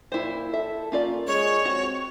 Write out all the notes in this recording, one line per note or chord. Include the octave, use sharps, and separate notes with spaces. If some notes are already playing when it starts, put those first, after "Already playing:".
A#2 E4 C5
A4 E5
A#3 C#4 F4 D5
G#3 C#5
C4 F#4